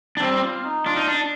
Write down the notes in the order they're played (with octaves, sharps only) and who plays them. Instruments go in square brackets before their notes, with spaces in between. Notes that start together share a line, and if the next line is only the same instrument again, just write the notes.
[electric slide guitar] D4
[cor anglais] G3 [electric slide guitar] C4
[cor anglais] F4
D#4
[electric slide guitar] D4 [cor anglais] F4
[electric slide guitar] D#4
D4